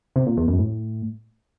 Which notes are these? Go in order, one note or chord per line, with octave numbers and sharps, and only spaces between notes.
C3
A#2
E2
F#2
A2